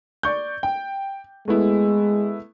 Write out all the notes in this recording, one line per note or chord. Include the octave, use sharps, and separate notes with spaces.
D5 C#6 G6
G5
G#3 A3 B3 E4